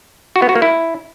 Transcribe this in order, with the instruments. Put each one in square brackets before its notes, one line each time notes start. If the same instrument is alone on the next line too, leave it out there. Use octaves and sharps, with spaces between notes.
[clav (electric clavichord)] F#4
B3
F#4
A#3
E4